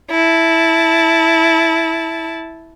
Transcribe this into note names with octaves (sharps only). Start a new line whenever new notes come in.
E4 A5